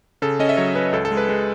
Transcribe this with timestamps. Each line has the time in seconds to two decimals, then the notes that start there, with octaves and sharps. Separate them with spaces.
0.22 C#3 A4
0.40 C#4 D#5
0.49 E5
0.57 F#3 C#5
0.75 C#4 B4
0.93 C#2 A4
1.05 A4
1.11 G#3
1.17 B4
1.29 G#3